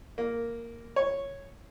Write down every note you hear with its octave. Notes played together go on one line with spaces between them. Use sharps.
A#3
C#5